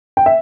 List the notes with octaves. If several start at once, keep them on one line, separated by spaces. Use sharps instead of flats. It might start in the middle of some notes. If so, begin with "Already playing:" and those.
G5
E5